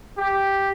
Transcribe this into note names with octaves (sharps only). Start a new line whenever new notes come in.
G4